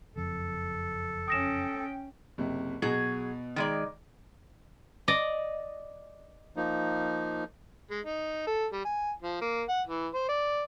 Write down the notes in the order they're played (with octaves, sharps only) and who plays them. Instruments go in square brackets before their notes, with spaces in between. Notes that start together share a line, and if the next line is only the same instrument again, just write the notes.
[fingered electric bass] F#1 F2 [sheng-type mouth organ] A4
[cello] C#4 G5 [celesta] D#6 A#6 E7
[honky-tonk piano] F#1 C3
[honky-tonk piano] B2 [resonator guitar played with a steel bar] F#3 G#4
[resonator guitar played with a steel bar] D#3 G#3 D5
[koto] D5 D#5
[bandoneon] F3 A#3 D#4
[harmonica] G#3
D#4
A4
G3
G#5
F3
A#3
F#5
E3
C5
D5